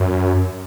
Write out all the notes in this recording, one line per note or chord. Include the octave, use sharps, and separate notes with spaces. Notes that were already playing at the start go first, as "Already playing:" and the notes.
Already playing: F#2